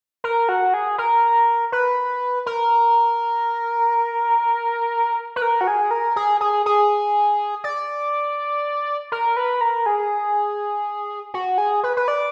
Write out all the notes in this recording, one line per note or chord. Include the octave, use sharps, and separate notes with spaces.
A#4
F#4
G#4
A#4
B4
A#4
B4
A#4
F#4
G#4
A#4
G#4
G#4
G#4
D5
A#4
B4
A#4
G#4
F#4
G#4
B4
B4
D5